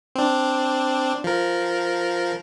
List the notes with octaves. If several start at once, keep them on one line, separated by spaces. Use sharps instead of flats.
C4 D4
F3 A#4